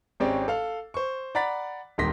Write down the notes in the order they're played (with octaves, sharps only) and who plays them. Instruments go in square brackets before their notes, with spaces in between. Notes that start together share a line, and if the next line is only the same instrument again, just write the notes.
[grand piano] G#1 G#3 C4 C#4 G4 D5
A4 F5
C5 C#6
D5 F#5 A#5 B5 A6 B6
D#1 C2 D#3 C6 A#6 B6